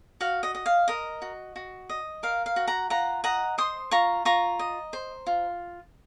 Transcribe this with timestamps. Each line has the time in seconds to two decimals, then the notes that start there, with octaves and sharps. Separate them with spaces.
0.21 F#4 F5
0.43 D#5
0.55 D#5
0.66 F5
0.88 A#4 D#5
1.22 F#4
1.56 F#4
1.90 D#5
2.23 A#4 F5
2.46 F5
2.56 F#4
2.67 F#5 A#5
2.90 F4 F#5 A#5
3.24 D#5 F#5 A#5
3.58 C5 C6 D#6
3.91 F4 A#5 C#6
4.25 F4 A#5 C#6
4.59 D#5
4.93 C5
5.27 F4